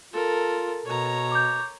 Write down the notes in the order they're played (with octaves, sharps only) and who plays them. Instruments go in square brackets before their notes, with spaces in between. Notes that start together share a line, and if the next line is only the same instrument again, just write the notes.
[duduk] F4 [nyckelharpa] A4 A#4
[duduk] B2 [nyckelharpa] C#5 A#5
[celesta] D6 G6